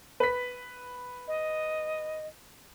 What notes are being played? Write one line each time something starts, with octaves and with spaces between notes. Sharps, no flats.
B4 B6
D#5